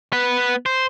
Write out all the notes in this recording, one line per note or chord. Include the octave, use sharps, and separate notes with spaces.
B3 B4
C5